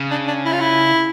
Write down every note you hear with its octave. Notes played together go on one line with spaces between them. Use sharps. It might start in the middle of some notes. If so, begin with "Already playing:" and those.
Already playing: C#3
D4
D4
E4
F4
E4